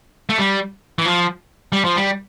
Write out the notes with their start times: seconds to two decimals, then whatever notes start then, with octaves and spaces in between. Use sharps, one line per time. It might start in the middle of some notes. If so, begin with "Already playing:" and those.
0.29 A3
0.38 G3
0.99 E3
1.05 F3
1.72 G3
1.84 F3
1.96 G3